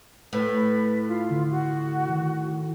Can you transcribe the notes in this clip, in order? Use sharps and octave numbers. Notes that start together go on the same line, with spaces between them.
A2 B4
F4
D3
F#4
D#3